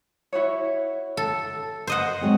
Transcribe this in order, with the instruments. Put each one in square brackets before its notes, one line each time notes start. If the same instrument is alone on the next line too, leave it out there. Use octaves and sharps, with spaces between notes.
[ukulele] E4 F#4 C#5
[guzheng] A4
C5 D#5 F#5
[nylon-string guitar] F#3 G#3 C4